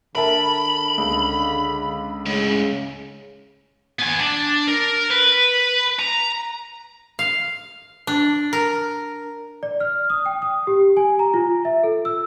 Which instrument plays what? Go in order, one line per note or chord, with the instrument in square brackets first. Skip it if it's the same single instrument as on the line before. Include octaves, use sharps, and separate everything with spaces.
[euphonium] D3 [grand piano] A#4 E5 A5 [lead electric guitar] B5
[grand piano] C#2
[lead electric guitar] A2 G#3 [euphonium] C#3
[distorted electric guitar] B3 G#5
D4
A#4
B4
A#5
[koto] F5
D4
A#4
[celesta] D5
F6
D#6
G5
D#6
G4
G#5
A#5
F4
E5
A4
E6